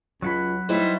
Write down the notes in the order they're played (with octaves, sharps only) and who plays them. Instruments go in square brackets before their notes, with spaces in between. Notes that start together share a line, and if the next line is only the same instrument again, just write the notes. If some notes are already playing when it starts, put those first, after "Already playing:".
[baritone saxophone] C#2 [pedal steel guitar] F#3 F#5 B5
[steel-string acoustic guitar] G3 B4 C5 [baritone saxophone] D#4 [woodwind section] E4 E5